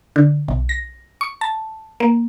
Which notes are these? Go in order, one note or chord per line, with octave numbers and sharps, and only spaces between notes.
D3
B1
A#6
C#6
A5
A#3